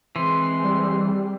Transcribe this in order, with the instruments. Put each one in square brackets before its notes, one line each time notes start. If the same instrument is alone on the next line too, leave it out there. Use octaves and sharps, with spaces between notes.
[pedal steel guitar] E3 [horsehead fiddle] G#3 C4 [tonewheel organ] C6
[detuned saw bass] G3